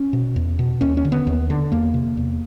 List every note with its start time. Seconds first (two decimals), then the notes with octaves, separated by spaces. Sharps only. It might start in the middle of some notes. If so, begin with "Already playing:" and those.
Already playing: C#4
0.13 B2
0.36 E2
0.59 B2
0.81 D#2 C#4
0.97 C#4
1.05 D3
1.12 B3
1.27 D#2
1.50 D3
1.72 E2 A#3
1.94 C3
2.17 E2